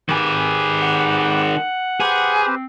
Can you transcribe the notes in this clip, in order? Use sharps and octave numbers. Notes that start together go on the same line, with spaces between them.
D#3 G4 G#4 B4
F#5
G4 G#4 B4 C5
C4